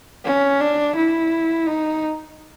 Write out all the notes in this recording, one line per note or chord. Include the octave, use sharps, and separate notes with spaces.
C#4
D4
E4
D#4